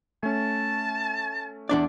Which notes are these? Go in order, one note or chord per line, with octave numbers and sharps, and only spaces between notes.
A3 C#4 A5
E2 D4 D5